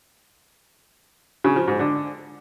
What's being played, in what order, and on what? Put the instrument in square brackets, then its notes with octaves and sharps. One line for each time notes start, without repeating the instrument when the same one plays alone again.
[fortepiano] C#3
F3
G#2
D3